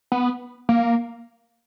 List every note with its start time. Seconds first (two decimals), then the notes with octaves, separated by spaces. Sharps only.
0.12 B3
0.69 A#3